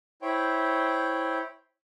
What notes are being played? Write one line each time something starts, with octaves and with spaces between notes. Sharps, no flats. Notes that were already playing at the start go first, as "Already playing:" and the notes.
E4 C5 C#5 G5